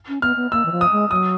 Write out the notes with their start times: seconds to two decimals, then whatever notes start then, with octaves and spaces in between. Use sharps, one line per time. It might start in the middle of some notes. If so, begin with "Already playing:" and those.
0.08 C#4
0.22 B3 F6
0.37 B3
0.52 A#3 E6
0.65 E3
0.72 F3
0.81 D#6
0.92 G#3
1.11 F#3 D#6